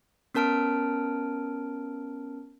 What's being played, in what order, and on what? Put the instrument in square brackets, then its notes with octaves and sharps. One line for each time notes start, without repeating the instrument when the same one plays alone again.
[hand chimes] B3 C#4 A#4 A5 F6 D7